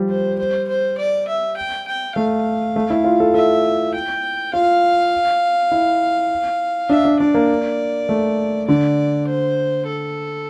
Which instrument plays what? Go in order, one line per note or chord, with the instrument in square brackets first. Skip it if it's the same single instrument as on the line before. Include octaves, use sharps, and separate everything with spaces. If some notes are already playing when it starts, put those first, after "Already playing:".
Already playing: [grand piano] F3 G3
[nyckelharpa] C5
C5
C5
D5
E5
G5
G5
[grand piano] A3 [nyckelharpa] F5
[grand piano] A3
E4
F4
A4
[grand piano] A4 [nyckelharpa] E5
[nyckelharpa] G5
[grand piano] F4 [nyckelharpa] F5
[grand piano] E4
[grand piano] D4 [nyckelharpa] E5
[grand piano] D4
[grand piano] D4 [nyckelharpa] D5
[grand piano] A#3
A3
[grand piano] D3 [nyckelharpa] D5
[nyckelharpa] C5
A4